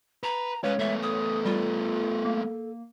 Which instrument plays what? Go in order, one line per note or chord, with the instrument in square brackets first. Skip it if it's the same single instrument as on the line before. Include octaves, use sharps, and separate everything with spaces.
[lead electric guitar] B4 [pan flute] A#5
[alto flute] G#3 [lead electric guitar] C#4 F4 [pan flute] B4 [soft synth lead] C#5
[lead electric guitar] A3 B3 [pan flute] E5
[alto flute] A4 [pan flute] D#6
[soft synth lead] G3 [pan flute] F4
[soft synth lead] A#3